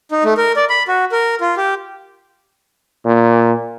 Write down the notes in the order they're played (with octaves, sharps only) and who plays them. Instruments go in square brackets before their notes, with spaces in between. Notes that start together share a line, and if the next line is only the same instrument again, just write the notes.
[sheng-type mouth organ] D#4
A3
A#4
D5
B5
F#4
A#4
F4
G4
[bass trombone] A#2